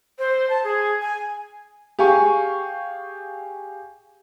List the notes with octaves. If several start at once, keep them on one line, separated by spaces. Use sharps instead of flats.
C5
A5
G#4
G#5
G4 G#4 F5 G#5 C#6